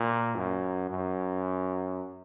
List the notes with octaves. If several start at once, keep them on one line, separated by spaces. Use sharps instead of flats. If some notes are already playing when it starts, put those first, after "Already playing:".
Already playing: A#2
F#2
F#2